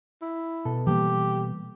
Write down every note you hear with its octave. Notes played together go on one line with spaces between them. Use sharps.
E4
B2 A4
E3 G3 A#3 G4